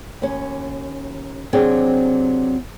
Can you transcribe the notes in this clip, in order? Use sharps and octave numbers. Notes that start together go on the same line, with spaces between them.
D#2 C#4
C3 F#3 C4 D4 G#4